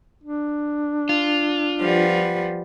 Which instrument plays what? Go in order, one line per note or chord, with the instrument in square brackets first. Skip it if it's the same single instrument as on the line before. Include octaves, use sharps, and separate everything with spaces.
[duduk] D4
[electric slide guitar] F4
[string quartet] F3 G3 B3